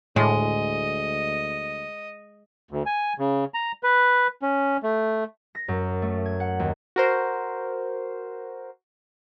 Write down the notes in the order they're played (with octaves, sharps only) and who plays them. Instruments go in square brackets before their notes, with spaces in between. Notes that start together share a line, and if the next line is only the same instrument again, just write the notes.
[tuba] D2 [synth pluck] A2 [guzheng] G#3 [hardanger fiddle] D#5
[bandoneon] D2
G#5
C#3
A#5
B4
C#4
A3
[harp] A#6
F#2
A3
G#6
F#5
D#2
[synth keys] F#4 A#4 C5